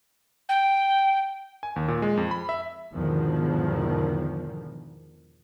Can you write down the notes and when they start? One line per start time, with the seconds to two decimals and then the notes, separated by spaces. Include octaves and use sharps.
0.49 G5
1.63 G#5
1.76 D#2
1.88 A#2
2.02 G#3
2.17 F2
2.31 B5
2.49 E5
2.94 E2 G#2 B2 D3 D#3 F3